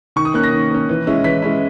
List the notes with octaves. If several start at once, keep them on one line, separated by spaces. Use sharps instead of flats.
D#3 C#6
D#6
A#3 C#4 F#6
A#6
D#3
A#3 C#4
E3
G#3 C#4 E4
E3 B6
G#3 C#4 E4